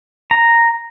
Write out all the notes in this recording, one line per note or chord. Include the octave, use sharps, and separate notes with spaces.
A#5